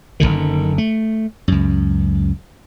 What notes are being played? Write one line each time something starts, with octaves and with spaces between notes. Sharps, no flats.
F#1 D#2 D3 D#3
A3
C#2 F#2